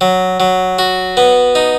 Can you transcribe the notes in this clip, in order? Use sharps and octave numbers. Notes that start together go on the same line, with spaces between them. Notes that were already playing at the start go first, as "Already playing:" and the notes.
F#3
F#3
F#4
B3
D#4